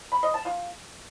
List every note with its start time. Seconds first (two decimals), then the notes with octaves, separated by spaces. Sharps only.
0.12 B5
0.23 D#5
0.34 A5
0.45 F4